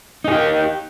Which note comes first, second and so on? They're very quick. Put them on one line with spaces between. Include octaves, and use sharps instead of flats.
D#4 G#4 G4